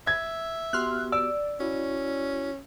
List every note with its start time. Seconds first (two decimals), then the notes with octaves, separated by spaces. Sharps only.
0.07 E5 G#6
0.73 B3 F#4 G4 C6 F6 F#6
1.12 D5 E6
1.60 C#4 E4 F#4